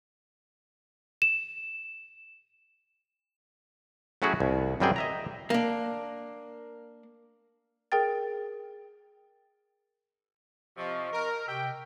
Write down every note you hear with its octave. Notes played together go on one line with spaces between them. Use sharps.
E7
F#3 A3 C#4 E4 F#4 G#4
C2
F#2 F#3 G3 C4 G#4 G5
D#5 E5 A#5
A#3 D4
G#4 A#4 G5 A6
C3 F3 D#5 C#6
A#4
C3 G4 E5 G5